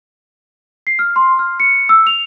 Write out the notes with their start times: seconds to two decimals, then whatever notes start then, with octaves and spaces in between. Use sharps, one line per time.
0.87 C7
0.99 F6
1.16 C6
1.39 F6
1.60 C#7
1.89 E6
2.07 F7